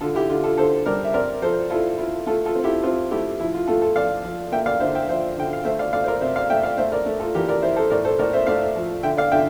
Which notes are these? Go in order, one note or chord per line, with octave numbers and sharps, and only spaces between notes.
D3 F4 A4
E4 G4
D3 F4
F4 A4
D3 A4 C5
G3 A#4 D5
E5
C4 A#4 D5
F3 A4 C5
E4 F4 A4
E4 F4
A3 F4 A4
F4 A4
C4
E4 G4
C4 F4
A3 E4 G4
F3 E4
F4
A3 F4 A4
F4 A4
F3 D5 F5
F3
A#3 E5 G5
D5 F5
D3 C5 E5
E5 G5
F3 C5 E5
D3 G5
F5
A3 C5 E5
D5 F5
A3 D5 F5
C5
A#4 D5
C3 C5 E5
D5 F5
A3 E5 G5
D5 F5
A3 C5 E5
A#4 D5
A3
F4 A4
E3 G4 A#4
A#4 D5
E4 C5 E5
A4 C5
A2 A#4 D5
A4 C5
A2 A#4 D5
C5 E5
A3 D5 F5
F3
D3 E5 G5
D5 F5
D3 E5 G5